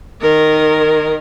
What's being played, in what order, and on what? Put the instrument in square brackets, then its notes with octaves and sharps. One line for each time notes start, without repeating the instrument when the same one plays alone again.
[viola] D#3 A#4